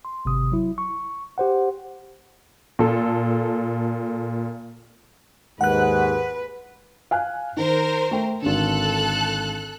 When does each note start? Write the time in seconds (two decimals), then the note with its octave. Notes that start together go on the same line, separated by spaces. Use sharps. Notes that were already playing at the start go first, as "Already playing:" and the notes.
0.05 C6
0.25 G#1 C3 D#6
0.52 F#3 E4
0.78 C#6
1.38 G4 C5 F#5
2.79 A#2 A4
5.61 D#2 G#2 G#3 B4 F#5 F#6
7.11 F5 G#5 F#6
7.57 D#3 A#4 C5
8.11 A3 G5
8.42 G#1 D3 A4 F#6